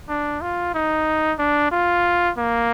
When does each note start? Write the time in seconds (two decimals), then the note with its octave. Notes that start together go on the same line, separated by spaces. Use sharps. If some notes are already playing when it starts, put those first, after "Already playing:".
0.09 D4
0.41 F4
0.74 D#4
1.39 D4
1.72 F4
2.37 A#3